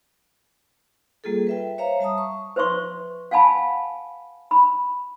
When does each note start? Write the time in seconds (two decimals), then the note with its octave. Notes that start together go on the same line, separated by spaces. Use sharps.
1.24 G3 A#3 F4 G#4 A4
1.47 B4 E5 G5
1.78 C5 C#5 E5 F5 A#5
2.00 G3 E5 A5 A#5 D#6
2.18 C#6
2.56 B4 C5 E5 C6 C#6
3.31 F5 F#5 G#5 A5 B5
4.51 B5